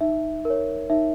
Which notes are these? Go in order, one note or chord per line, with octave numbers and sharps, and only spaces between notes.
D#4 E5
A#4 C#5
D#4 E5